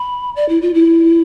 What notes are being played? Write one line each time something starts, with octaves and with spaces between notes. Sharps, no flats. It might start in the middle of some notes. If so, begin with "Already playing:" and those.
Already playing: B5
D5
E4
F4
E4